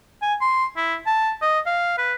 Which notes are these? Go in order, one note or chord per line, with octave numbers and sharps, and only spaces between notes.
G#5
C6
E4
A5
D#5
F5
B4